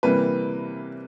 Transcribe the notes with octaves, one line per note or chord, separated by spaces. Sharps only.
C3 E3 G3 A#3 B4